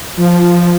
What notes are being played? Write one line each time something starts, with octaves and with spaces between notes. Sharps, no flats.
F3